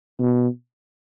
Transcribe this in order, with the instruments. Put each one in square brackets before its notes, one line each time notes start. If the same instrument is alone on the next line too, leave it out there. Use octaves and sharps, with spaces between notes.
[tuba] B2